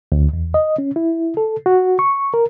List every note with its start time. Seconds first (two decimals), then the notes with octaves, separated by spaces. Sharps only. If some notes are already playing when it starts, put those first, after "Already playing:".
0.12 D2
0.33 E2
0.54 D#5
0.78 C#4
0.96 E4
1.37 A4
1.66 F#4
1.99 C#6
2.34 A#4